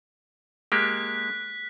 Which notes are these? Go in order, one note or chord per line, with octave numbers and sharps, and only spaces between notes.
G#3 A#3 G4 F#6 B6